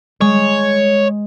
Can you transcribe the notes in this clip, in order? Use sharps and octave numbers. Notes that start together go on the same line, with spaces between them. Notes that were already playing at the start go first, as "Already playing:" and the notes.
G#3 C#5